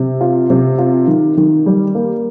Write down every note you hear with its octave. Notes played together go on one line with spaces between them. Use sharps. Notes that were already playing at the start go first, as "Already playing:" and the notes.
Already playing: C3
F4
C3
F4
D#3
D#3
G3
A#3